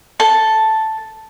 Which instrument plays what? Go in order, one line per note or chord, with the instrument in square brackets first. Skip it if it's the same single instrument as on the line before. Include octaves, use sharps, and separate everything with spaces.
[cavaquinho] A4 A5